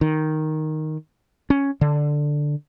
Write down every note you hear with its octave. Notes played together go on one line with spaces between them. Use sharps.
D#3
C#4
D3